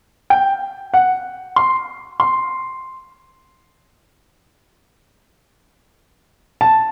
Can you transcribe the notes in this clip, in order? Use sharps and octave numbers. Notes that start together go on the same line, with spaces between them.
G5
F#5
C6
C6
A5